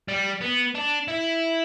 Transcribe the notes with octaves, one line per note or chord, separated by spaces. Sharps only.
G3
B3
D4
E4